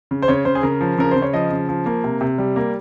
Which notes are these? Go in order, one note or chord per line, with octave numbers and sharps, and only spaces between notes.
C#3
C5
C#3 C#5
C#3 C5
G#4
C#3 A#4
F3
C#3 A#4
C#3 C5
C#5
F3 D#5
C#3
F3
A#3
C3
C3
G3
A#3